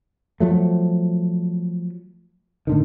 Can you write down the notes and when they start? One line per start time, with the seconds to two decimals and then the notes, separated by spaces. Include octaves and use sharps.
0.40 F3 F#3 A3
2.67 A2 D3 D#3